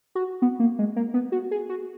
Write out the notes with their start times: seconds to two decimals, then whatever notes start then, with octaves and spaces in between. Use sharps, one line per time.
0.15 F#4
0.42 B3
0.60 A#3
0.79 G#3
0.96 A#3
1.14 B3
1.32 F#4
1.51 G#4
1.69 F#4